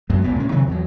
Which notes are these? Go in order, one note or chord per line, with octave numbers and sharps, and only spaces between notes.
F#2 F#3 G#3
E1 C#2 A#2 B3
A#2 C#4
C3 D#3 F#3 C4
E2 F#3